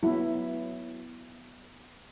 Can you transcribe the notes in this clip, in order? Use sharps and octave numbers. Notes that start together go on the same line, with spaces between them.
F#3 B3 E4